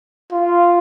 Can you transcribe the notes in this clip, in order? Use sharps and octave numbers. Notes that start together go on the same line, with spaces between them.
F4